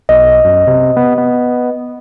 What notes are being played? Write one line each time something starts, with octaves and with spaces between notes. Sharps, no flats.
B1 D#5
F#2
C3
B3
B3